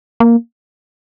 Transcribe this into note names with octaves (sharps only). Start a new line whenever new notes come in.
A#3